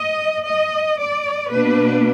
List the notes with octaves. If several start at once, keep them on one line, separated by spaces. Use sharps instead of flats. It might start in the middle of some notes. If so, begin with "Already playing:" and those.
Already playing: D#5
D#5
D5
B2 A#3 D4 B4